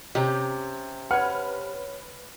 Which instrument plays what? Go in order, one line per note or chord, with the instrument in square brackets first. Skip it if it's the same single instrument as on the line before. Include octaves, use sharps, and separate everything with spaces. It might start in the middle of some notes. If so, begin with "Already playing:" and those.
[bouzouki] C3 A#5 [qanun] C#4 G4
[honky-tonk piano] B4 F6 [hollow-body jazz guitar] C#5 F#5